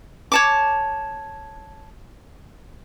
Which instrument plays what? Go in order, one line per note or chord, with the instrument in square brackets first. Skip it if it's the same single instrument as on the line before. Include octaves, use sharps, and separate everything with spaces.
[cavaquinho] C#5 A5 D6